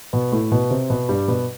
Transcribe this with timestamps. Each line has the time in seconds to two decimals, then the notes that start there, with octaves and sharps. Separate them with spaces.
0.13 B2 B3
0.32 A2 A3
0.52 B2 B3
0.70 C3 C4
0.90 B2 B3
1.09 G2 G3
1.28 B2 B3